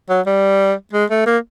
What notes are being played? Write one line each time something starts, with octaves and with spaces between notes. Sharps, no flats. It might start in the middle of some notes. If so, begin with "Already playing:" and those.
F#3
G3
G#3
A3
A#3